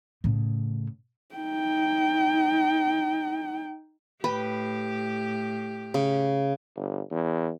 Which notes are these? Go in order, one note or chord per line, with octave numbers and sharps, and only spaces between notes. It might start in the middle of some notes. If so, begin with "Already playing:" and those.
A2 C#3
D#4 G5
A2 G4 B4 G5
C#3
G1
E2